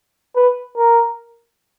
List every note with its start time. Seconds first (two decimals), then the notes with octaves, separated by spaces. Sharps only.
0.36 B4
0.77 A#4